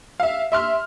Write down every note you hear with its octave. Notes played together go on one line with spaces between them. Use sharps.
E5 F5
E5 C6 F6